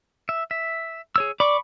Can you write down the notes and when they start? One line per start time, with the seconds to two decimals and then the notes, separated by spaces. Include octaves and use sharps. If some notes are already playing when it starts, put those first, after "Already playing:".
0.29 E5
0.51 E5
1.16 G#4 C#5 E6
1.40 D5 B5 C#6 D6